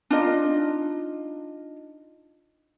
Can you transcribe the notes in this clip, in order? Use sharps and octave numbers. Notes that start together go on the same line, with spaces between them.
D4 D#4 F4 D#5